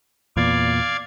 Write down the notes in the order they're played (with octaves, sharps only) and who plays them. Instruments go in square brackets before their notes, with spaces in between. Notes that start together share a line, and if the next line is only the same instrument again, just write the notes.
[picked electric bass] E2 A#2 [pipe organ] D5 F5 G#6